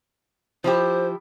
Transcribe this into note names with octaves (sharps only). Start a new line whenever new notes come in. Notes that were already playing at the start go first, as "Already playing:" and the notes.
F3 E4 G4 C5